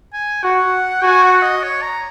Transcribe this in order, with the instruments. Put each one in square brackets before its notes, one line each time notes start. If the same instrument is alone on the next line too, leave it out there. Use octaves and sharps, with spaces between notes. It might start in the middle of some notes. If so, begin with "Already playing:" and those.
[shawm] G#5
[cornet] F#4 [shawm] F#5
[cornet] F#4 [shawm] G#5
[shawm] F#5
D#5
C#5
A#5